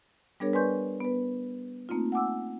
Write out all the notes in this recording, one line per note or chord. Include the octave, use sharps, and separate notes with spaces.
G3 B3 D4 G#4 A#4 C#5
B4 D5 G#5 C6 C#6 G6
B3 B4
A3 A#3 C4 D#4 F4
F#5 G#5 D6 E6